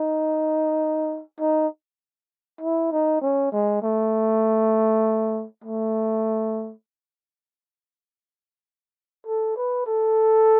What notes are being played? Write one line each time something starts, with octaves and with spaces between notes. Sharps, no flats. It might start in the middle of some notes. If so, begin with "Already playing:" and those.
Already playing: D#4
D#4
E4
D#4
C#4
G#3
A3
A3
A4
B4
A4